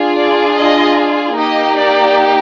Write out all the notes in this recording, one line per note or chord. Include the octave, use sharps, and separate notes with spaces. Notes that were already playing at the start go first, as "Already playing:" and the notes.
Already playing: D4 F4 G#4
D5
D#5
A#3 D#4 G4 D#5
D5